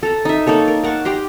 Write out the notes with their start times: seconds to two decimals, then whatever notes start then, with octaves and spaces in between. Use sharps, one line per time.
0.03 A4 A#5
0.25 D#4 E5
0.47 A#3 D#4 A4 C#5
0.68 A#4
0.83 A#4 F#5 A5 C#6
1.05 G4 A#5 C6